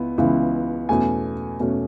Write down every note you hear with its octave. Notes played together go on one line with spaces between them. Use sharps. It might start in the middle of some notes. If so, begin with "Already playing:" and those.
Already playing: C#2 B3 E4
C#2 C#3 E3 B3 E4
E2 B2 A3 C#4 G#5
E2 B2 A3 C#4